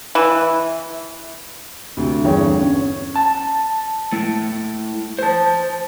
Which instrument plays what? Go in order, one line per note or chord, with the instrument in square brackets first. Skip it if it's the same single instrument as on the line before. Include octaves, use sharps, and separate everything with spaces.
[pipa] E3
[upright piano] D2 C3
G1 E2 C#5 G5
C#4
[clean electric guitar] A5
A3 E4
C5 A5